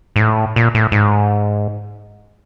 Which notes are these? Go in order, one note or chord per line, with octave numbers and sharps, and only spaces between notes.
G#2
A2
A#2
A2
G#2